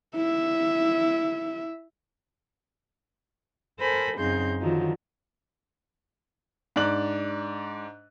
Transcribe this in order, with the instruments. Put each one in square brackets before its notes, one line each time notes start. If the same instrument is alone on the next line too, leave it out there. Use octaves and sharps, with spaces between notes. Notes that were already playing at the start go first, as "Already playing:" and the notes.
[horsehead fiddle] E4 E5
[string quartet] A4 A#4 C5 G#5 B5
F#2 C#3 C4 D#4 C6 G6
D3 D#3 F3 F#3 D#4
[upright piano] G#2 D4 D5 F#6 F#7